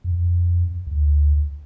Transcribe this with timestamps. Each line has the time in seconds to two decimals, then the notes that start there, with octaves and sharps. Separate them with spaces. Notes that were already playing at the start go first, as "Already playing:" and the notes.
0.04 F2
0.87 D2